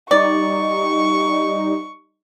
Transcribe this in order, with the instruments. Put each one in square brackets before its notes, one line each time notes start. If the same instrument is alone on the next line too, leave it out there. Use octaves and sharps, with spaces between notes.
[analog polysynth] G3 D#4 [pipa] D5 [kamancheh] C#6